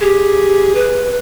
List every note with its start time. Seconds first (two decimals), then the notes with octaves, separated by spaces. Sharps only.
0.01 G4 G#4
0.75 B4